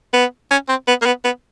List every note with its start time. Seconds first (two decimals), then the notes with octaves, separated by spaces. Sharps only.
0.13 B3
0.50 C#4
0.68 C4
0.87 B3
1.02 A#3
1.06 B3
1.24 B3